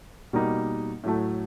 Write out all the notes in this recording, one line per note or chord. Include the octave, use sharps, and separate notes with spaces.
B2 G3 A#3 D#4
A2 F#3 A3